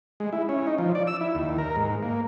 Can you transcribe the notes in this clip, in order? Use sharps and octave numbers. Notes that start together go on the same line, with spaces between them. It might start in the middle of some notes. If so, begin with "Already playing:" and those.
G#3
E4
C#4
D#4
F3
D5
E6
E4
D#2
A#4
G#2
A#3